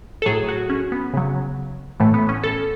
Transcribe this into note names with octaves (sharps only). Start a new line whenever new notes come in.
A4
A2 F#3 G#4
F#4
C#4
B3
C#3 F#3
A2 E3 A3
B3
C#4
A4